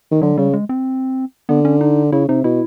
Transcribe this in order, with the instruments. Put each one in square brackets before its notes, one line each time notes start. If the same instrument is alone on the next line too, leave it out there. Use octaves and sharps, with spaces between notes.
[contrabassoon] D#3
[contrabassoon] D3 [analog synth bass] F#3
[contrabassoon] C#3 [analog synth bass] G3
[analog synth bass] G#3
C4
[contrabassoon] D3 [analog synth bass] B3
[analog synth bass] C#4
D#4
[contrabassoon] C#3 [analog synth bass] E4
[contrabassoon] C3 [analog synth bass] D#4
[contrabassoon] B2 [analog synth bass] E4